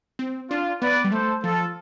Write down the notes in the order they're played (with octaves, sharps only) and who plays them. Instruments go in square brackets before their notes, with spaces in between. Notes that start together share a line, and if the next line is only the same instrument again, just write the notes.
[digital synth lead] C4
[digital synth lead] D4 [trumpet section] F4
[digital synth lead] B3 [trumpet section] B4 D5
[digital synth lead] G3
[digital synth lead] A3 [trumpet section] A4 C5
[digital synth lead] F3 [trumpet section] F4 A4